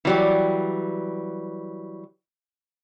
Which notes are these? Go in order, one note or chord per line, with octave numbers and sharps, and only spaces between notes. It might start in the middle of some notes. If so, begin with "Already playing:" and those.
E3 F#3 G3